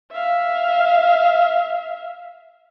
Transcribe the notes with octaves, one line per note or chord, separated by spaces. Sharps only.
E5 F5